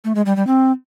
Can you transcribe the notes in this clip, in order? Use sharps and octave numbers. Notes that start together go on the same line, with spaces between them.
A3
G#3
G3
G3
C4